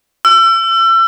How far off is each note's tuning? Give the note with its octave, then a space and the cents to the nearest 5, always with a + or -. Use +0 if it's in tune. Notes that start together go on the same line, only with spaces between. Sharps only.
E6 +35